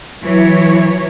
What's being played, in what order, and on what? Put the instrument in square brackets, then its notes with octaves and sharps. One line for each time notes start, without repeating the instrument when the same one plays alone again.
[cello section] E3 F#3 C#5